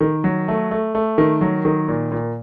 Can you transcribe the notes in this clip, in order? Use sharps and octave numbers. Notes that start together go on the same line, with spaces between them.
D#3
F#3
A3
A3
A3
D#3
F#3
D#3
A#2
A#2